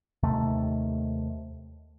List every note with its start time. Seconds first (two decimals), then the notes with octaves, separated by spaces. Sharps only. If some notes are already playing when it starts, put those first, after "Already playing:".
0.23 D#2 C3 D#3 A3